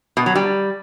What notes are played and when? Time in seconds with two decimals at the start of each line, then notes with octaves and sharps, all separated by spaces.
0.17 B2
0.26 F#3
0.36 G3